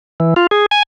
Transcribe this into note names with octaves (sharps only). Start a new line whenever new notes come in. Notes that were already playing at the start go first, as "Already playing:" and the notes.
E3
F4
G#4
G#5